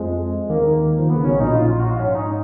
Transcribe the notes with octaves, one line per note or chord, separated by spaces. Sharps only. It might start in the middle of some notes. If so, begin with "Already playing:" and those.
Already playing: F2 F3 G#3
D#2 D#3 A#3
F3
D#3 B3
C#3
B1 B2 C#4
A#1 A#2 D#4
F4
F4
F#4
F4
G#2 C#4
D#4